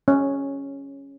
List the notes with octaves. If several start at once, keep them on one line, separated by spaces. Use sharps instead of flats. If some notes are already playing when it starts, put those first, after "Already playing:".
C#4